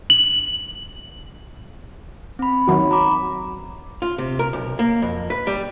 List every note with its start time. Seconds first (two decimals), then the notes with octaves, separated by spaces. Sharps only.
0.10 F#7
2.39 C4 B5
2.68 D#3 F#3 F#4
2.91 A#5 B5 D6
4.02 F4
4.18 C3
4.39 A#4
4.53 B1
4.79 A#3
5.02 F2
5.30 B4
5.47 G3